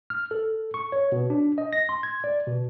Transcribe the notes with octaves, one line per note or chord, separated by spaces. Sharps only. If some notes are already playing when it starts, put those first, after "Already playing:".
F6
A4
C#6
C#5
B2
D4
D#5
A#6
C6
G#6
D5
B2